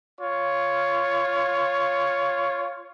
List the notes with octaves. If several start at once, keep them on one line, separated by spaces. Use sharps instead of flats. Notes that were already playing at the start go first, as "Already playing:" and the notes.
F4 C#5